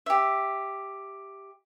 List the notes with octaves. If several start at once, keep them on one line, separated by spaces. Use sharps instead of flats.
G4 E5